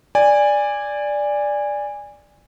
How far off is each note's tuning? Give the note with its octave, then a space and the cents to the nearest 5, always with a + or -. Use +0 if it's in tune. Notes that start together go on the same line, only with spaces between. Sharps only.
D5 +0 G#5 -20